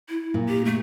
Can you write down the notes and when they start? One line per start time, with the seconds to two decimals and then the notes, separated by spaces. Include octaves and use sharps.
0.10 E4
0.34 A#2
0.48 G4
0.65 A3